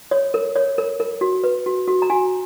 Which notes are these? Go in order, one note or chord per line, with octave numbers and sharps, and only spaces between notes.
C#5
A#4
C#5
A#4
A#4
F#4
B4
F#4
F#4
A#5
F#4 G#5